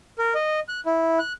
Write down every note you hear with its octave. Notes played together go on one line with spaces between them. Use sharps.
A#4
D#5
F#6
E4
F#6